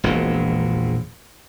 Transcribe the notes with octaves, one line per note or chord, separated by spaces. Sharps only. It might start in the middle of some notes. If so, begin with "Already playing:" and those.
E1 A#1 A#2